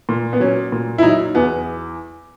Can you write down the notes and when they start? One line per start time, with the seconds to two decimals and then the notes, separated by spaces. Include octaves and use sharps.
0.09 A#2
0.33 B3
0.40 F#3 C#4
0.72 A#2
0.98 E4
1.03 F#3 D#4
1.35 E2 B3